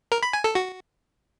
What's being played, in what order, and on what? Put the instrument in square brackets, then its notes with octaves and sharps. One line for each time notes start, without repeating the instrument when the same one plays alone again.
[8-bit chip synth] A#4
B5
G#5
A4
F#4